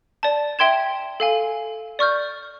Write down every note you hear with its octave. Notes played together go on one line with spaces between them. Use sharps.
D5 A5
E5 G5 C6 G#6 E7
A4 F5 G#5
D5 C#6 F6 G6